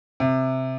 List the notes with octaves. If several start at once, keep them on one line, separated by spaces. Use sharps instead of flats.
C3